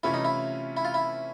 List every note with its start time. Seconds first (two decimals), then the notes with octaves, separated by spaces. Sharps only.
0.03 C3 E3 A3 C#4 E4 F4
0.14 D#4
0.25 E4
0.77 E4
0.85 F4
0.94 E4